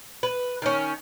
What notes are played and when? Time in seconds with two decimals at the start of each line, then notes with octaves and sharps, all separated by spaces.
0.23 B4
0.62 D#3 C#4